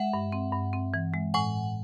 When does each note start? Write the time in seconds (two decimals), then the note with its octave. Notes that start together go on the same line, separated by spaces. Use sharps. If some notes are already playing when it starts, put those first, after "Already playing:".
Already playing: G#3 E5 F#5
0.13 G2
0.32 C4
0.53 G2
0.73 C4
0.94 E3
1.14 G#3
1.34 A2 F#5 G#5